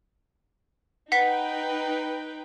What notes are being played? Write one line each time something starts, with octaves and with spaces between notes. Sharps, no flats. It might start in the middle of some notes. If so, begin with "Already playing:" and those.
D#4 B4 F#5 G5 B6